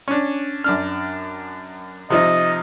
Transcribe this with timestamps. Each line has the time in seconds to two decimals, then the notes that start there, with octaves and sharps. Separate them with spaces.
0.08 C#4 D4
0.64 F#2 D4 F6
2.10 C3 F3 D#4 D#5